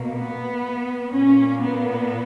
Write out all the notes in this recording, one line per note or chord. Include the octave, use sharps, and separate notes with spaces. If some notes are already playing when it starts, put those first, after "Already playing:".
Already playing: B2 A#3
B3
A#2 A#3 C#4
B3